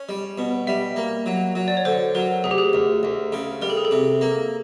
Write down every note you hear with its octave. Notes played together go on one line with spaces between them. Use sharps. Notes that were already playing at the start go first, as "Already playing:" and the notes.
Already playing: C#4
G3
B2
G3 E5
A#3
F#3
F#3
D5
C#5
D3 C5
F#3 A#4
D2 G#4
G4
G#4
D2
D2
C#3
G3 A#4
A4
G#4
A4
C3
A#3